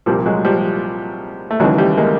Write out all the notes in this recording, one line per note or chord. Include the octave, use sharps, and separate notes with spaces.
C2 A#2 F3 G3
F#3 G#3
F3 G3
A3
D#2 C#3 E3 F#3 G#3
G3 A3
G#3 A#3